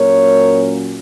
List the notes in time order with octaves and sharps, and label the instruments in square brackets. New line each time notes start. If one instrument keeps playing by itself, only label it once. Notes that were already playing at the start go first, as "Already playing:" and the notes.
Already playing: [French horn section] A#2 F#3 A#3 C#4 A#4 C#5